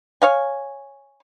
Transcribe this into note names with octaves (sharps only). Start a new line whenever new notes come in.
C#5 F5 G#5